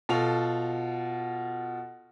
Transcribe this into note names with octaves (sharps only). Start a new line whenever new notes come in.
B2 F4 A4 F7